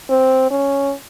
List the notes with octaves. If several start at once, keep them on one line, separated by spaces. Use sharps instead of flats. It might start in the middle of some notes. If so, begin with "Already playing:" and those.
C4
C#4